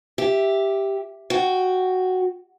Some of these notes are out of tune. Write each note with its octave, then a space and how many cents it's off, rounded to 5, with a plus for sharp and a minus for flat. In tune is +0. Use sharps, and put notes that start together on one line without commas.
G4 +0 E5 +0
F#4 +0 G5 -10